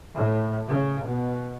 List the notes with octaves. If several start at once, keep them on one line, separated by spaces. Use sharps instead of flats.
A2
C#3
B2